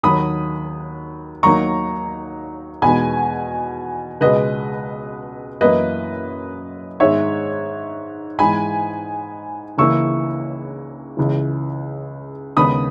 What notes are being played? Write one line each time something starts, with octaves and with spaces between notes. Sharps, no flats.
D#2 D#3 F#3 B5 D#6
D#2 D#3 F#3 A#3 D#4 A#5 C#6
E2 B2 G#3 B3 D#4 G#5 B5
C#2 B2 G#3 B4 D#5
F#2 E3 A#3 E4 B4 D#5
G#2 D#3 G#3 C#5 E5
G#2 E3 G#3 D#4 G#5 B5
C#2 C#3 E3 A#3 E4 C#6 E6
C#2 C#3 E3
D#2 C#3 G#3 B3 D#4 B5 D#6